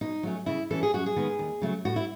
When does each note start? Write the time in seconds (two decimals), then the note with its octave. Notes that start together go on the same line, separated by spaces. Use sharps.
0.01 B2 D#4
0.23 F#3 A3 C#4
0.46 C#3 E4
0.70 E3 A3 C#4 A4
0.83 G#4
0.94 F#2 F#4
1.06 G#4
1.16 D#3 G#3 B3
1.39 D#2
1.62 C#3 F#3 A3
1.85 A2 F#4
1.96 E4